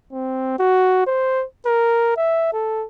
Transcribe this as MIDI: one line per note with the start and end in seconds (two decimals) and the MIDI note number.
0.13 0.56 60
0.59 1.02 66
1.07 1.44 72
1.66 2.16 70
2.17 2.52 76
2.53 2.86 69